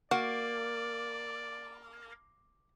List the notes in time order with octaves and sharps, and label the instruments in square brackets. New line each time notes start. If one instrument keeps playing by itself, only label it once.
[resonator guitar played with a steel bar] A#3 [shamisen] F#4 [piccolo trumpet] D5